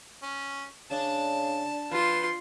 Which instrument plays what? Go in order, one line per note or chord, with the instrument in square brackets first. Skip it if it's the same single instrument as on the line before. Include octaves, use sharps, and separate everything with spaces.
[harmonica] C#4
[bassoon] C#3 [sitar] D4 [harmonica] A5
[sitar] F3 [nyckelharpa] F4 C6 [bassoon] B4